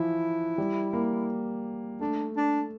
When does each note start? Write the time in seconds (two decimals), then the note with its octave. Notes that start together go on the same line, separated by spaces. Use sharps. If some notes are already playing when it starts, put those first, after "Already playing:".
Already playing: E3 F3 E4
0.58 G3
0.93 A#3
2.01 A3 D4
2.37 D4